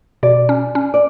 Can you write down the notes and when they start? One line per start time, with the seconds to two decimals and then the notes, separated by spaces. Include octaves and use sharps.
0.23 B2 D5
0.49 C#4
0.75 C#4
0.94 D5